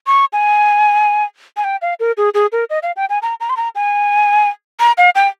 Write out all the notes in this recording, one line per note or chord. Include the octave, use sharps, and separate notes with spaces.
C#6
G#5
G#5
G5
F5
A#4
G#4
G#4
A#4
D#5
F5
G5
G#5
A#5
A#5
C6
A#5
G#5
A#5
F5
G5